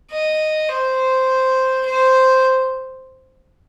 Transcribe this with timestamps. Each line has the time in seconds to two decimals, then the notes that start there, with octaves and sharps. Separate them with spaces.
0.11 D#5
0.69 C5
1.85 C5